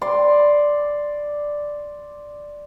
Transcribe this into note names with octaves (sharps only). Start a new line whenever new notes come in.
D5 C6